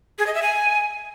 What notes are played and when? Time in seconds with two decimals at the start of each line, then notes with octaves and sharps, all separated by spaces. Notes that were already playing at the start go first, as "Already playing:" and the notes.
0.19 G#4
0.27 D#5
0.35 E5
0.42 G#5